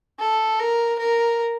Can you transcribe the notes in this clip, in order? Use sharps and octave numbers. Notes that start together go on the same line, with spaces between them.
A4
A#4
A#4